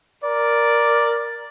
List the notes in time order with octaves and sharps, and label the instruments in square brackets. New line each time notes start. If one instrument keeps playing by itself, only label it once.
[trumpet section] A#4 D5